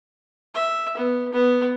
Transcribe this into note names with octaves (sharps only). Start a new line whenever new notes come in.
E5
B3
B3